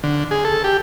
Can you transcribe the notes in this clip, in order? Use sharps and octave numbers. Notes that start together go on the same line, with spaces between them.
D3
G#4
A4
G4